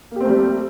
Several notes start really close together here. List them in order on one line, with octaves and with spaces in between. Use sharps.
A#3 G4 C4 A3 G3